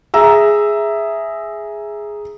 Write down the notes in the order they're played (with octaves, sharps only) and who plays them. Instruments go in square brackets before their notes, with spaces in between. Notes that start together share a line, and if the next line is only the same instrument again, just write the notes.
[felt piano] G#4 E5 A#5 E6